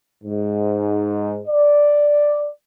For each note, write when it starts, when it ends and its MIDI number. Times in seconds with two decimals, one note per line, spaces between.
0.24 1.41 44
1.48 2.49 74